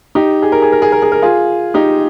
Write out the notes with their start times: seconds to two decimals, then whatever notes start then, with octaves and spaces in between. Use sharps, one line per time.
0.15 D#4 G4
0.42 G#4
0.52 A#4
0.62 G#4
0.72 A#4
0.82 G#4
0.92 A#4
1.02 G#4
1.12 A#4
1.22 F4 G#4
1.74 D#4 G4